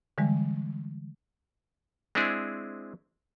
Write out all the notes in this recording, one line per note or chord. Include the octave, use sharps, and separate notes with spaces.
D3 E3 G3 G#3
G#3 C4 D4 E4 G#4